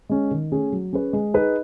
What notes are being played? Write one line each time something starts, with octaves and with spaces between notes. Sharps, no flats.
G#3 C#4
D#3
A3 C#4 G#4
F#3
C#4 G#4 B4
G#3
D#4 G#4 B4 D#5